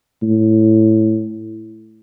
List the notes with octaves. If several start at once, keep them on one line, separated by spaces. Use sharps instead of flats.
A2